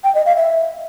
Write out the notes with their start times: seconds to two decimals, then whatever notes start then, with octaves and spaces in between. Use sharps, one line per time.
0.04 G5
0.15 D#5
0.26 F5
0.37 E5